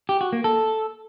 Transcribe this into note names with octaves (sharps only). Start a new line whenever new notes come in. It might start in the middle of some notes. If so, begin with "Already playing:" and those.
G4
F#4
A#3
A4